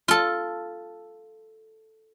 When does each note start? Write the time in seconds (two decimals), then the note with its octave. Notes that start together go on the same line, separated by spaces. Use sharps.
0.08 F4 A4